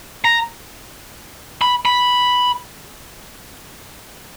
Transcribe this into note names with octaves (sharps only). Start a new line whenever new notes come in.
A#5
B5
B5